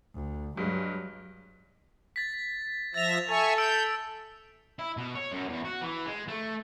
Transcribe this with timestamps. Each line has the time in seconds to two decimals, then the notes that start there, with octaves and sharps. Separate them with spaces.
0.15 D2
0.57 G2 F#3 G#3
2.16 A6 B6
2.94 F3 E5 A6 A#6 F7
3.29 A4 E5 G#5 C#6 A6
3.58 E6 G6 D7
4.79 E4
4.97 B2
5.15 C#5
5.32 F#2
5.48 E2
5.65 F#4
5.82 E3
6.06 G#3
6.27 A3